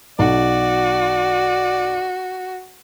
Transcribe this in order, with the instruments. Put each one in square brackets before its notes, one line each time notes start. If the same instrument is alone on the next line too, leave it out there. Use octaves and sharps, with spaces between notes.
[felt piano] B1 [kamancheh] F#4 [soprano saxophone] D5